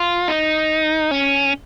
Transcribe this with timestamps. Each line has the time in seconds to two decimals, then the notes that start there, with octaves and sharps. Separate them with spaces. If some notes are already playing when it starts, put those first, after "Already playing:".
Already playing: F4
0.28 D#4
1.11 C#4